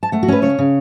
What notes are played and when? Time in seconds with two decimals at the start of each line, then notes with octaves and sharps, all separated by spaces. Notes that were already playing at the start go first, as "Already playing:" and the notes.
0.03 A5
0.12 A3 F#5
0.23 F#4
0.28 C#4 B4
0.42 C#3 C#5
0.58 C#3